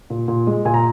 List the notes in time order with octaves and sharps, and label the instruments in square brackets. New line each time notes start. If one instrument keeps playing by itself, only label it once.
[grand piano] A#2
A#2
G#3
A#2 G#5
A#5